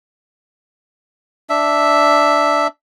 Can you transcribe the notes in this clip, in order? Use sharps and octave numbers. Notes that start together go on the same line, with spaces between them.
D4 E5